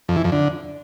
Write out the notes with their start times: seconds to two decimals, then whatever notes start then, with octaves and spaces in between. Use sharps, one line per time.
0.09 F2
0.16 E3
0.24 F2
0.32 D3